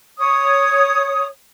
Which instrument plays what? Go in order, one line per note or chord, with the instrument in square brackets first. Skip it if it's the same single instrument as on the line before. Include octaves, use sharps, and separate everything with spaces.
[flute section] C#5 D#6